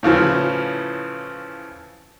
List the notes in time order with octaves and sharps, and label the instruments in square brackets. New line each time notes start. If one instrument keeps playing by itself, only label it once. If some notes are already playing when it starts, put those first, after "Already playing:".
[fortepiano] A2 C#3 E3 F3